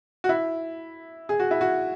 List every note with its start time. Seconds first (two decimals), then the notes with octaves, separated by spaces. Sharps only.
0.24 F#4
0.29 E4
1.29 G#4
1.40 F#4
1.51 E4
1.61 F#4